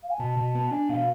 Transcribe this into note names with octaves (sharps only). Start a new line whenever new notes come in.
F5
G#5
B2 A5
B2
B3
D4 G#5
B2 F5